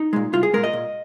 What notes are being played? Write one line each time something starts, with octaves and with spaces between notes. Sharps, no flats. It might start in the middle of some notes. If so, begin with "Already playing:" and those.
Already playing: D#4
A#2 G#3
C2 F4
G#4
A#2 G#3 A#4
D#5
A#2